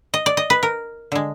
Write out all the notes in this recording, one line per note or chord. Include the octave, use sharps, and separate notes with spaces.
D#5
D5
D#5
B4
A#4
D3 G#3